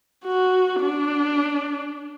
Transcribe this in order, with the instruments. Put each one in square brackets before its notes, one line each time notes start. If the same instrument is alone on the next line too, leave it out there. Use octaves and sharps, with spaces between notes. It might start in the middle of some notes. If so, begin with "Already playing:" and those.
[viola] F#4
D4